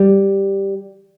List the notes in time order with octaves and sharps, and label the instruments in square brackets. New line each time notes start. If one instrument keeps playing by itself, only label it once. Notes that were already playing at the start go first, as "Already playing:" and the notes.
Already playing: [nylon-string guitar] G3